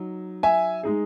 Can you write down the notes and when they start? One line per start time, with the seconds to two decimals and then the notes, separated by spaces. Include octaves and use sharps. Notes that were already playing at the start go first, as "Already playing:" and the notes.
Already playing: F#3 D#4
0.43 E5 G#5
0.83 G#3 D#4 G#4